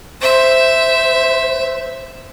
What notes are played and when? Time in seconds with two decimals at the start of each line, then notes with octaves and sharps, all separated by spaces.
0.22 C5 E5